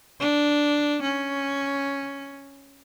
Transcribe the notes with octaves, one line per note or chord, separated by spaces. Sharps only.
D4
C#4